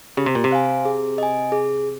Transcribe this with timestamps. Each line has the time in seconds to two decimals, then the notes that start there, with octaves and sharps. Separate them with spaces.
0.17 C#3 G4
0.26 C3
0.35 A#2
0.44 C3
0.51 C5 F5 G#5
0.85 G#4
1.18 D#5 G#5
1.52 G#4